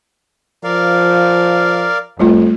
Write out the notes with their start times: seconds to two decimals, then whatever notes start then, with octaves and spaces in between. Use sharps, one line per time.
0.64 F3 A#4 D5 F5
2.19 F2 G3 A3 F4